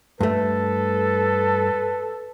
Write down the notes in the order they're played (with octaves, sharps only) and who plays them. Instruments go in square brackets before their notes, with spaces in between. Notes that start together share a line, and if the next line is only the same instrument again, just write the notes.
[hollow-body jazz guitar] G2 A3 [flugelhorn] A4 [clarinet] B4